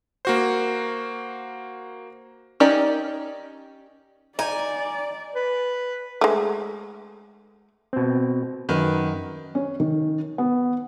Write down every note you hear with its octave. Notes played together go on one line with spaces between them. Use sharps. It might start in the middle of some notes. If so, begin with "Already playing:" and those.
A#3 F#4 C5
C#4 D#4 G4 A#4 D5
D#4 D5 G#5
B4
G#3 A3
B2 C4
F#2 D#3 B4
C#4
D#3
B3